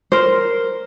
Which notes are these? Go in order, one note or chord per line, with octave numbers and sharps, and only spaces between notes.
A#4 C5